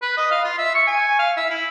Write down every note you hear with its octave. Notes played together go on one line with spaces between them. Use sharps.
B4
D#5
F5
F4
E5
C#6
G#5
F5
E5
E4